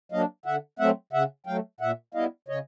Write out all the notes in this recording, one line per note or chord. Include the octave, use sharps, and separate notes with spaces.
F#3 A#3 D4 D#5 F5
D3 E5 F#5
F#3 A3 C4 E5 F#5
C#3 E5 F#5
F#3 A3 F5 G5
A#2 E5 F#5
G3 B3 E4 D#5 F5
C#3 C#5 D#5